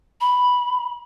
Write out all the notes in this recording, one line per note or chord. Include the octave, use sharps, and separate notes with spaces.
B5